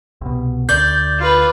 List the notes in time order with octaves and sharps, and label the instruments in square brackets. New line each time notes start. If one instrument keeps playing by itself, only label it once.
[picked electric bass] C2 B2
[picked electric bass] D2 [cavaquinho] D5 [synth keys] G6
[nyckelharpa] F4 B4